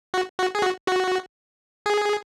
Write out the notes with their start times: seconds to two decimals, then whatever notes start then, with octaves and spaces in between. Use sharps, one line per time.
0.14 F#4
0.39 F#4
0.55 G#4
0.62 F#4
0.88 F#4
1.86 G#4